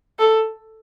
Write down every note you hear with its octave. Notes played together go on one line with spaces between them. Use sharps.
A4